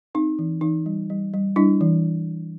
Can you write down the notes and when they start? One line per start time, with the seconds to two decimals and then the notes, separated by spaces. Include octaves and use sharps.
0.15 C4 D#4
0.39 E3
0.61 E3 D#4
0.86 G3
1.10 G3
1.34 G3
1.56 G3 D4 E4
1.81 E3